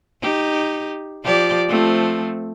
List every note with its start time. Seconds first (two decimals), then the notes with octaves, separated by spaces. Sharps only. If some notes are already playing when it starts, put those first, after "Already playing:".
0.21 D#4 G4
1.23 F3 G4 D5
1.68 F3 A3 C4